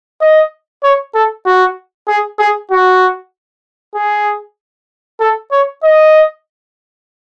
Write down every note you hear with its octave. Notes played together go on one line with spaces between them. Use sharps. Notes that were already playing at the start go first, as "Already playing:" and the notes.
D#5
C#5
A4
F#4
G#4
G#4
F#4
G#4
A4
C#5
D#5